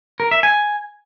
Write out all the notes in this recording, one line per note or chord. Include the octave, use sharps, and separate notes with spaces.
A#4
E5
G#5